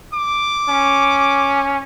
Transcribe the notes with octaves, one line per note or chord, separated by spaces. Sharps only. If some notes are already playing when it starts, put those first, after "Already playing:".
D6
C#4